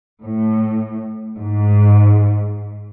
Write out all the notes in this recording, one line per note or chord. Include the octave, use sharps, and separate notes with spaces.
A2
G#2